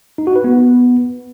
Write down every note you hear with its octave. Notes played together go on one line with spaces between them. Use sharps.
D#4
F#4
B4
B3